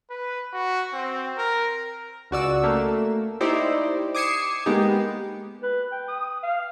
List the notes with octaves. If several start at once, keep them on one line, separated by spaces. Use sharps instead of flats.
B4
F#4
C4
A#4
C#2 F#4 D5 E6
A3 A#3
D#4 E4 G4 C5 D5
D6 D#6 G#6 C7 C#7 E7
G#3 A#3 B3 D#4 G4
B4
G5
D#6
F5